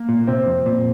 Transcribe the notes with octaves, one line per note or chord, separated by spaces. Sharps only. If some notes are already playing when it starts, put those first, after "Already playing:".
Already playing: A#3
A#2
C3 C4
F2
A#2